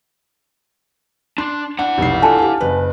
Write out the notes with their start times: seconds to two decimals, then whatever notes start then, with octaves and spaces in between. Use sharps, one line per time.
1.38 D4 C6
1.79 D4 E4 F#5
1.98 F1 B1 C7
2.22 D4 F4 A4 G#5 A5
2.38 G4 F5
2.61 F#1 B4